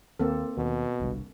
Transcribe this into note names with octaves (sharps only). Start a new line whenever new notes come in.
D#2 A#3 C4 A4
D#2 B2
G1 C2 G2